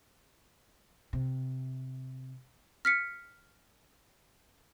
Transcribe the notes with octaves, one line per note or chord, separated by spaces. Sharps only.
C3
F6 B6 C#7